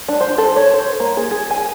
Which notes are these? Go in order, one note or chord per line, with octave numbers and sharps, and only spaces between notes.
D4
C5
A4
C#5
C5
A#3
G#4
G#4
G#5